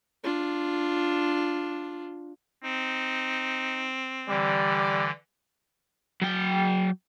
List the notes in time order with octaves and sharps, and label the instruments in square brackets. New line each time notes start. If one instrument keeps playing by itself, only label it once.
[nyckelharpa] D4 F4
[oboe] C4 [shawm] D#4
[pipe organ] D3 E3 [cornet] G3 [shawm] D5
[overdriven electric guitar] F#3 G5